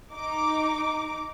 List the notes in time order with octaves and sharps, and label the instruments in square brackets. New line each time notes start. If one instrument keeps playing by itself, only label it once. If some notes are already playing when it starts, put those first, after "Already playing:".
[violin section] D#4 D6